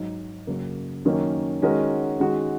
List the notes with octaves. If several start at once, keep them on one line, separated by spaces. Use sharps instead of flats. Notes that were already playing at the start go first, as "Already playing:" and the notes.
Already playing: G#2 F#3 D#4
F#2 C#3 A#3
F#2 D#3 A#3 C#4
D#3 G#3 C#4 F#4 A#4
D#3 G#3 C#4 F#4